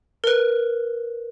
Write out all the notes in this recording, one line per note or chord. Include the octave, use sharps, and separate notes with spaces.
A#4 B4